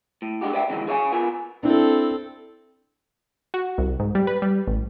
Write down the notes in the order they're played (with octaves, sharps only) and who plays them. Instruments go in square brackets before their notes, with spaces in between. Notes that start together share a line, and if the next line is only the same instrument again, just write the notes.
[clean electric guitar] A2
G#3 D4 D#4 F#4 G4
B4 D5 E5 G5
C3 D#3 E3 G#3 D#4 F#4
G#4 A#4 C#5 D#5 F5 G#5
B3 F4 A#4 B4 G#5
[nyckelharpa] C4 A4 [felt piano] D4 E4
[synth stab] F#4
C2
G#2
G3
B4
G3
A1